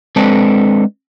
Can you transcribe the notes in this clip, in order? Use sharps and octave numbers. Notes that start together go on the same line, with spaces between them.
G#3 C4 D4 A4 B4 C5